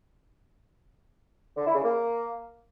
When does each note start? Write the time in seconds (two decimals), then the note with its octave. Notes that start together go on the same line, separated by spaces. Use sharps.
1.56 D3
1.65 E4
1.74 C#3
1.83 A#3